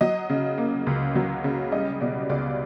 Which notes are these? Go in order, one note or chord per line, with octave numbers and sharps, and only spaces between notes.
F#3 D#5
C#3
A#3
C#2
F#3
C#3
G3 D#5
B2 D5
C#2 D5